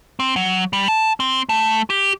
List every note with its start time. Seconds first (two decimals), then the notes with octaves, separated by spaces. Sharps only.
0.20 C4
0.36 F#3
0.73 G3
0.88 A5
1.20 C4
1.49 A3
1.90 G4